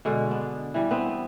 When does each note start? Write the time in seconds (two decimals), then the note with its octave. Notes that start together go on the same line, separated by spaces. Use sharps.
0.05 B2 D3 G#3
0.31 B3 D4
0.74 E3 G3
0.91 B3 C4